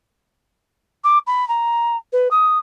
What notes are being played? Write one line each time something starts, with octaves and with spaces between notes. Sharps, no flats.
D6
B5
A#5
B4
D#6